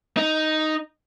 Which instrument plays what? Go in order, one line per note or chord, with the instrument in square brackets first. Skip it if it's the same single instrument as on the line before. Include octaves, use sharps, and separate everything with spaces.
[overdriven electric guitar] D#4